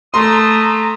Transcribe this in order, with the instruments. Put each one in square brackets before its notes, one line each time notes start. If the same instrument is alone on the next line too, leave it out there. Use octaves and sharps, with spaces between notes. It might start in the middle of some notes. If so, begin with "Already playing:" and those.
[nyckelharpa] A3 [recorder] A#5 [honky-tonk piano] C6 [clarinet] D#6